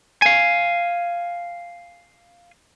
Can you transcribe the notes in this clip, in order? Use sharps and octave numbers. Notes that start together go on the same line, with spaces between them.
F5 G#5